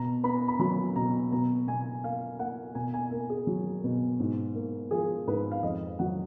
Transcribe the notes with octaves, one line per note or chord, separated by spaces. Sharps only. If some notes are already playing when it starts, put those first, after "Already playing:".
Already playing: B2 A#5
B3 B5
B5
F#3 B5
B2 A#5
B2 A#5
B2 G#5
A#3 F5
A#3 F#5
B2 G#5
G#5
A#3 A#4
G#4
F#3
B2
G#2
A#3
F3 G#4
G#2 B4
F5
F2 D#5
F#3 F#5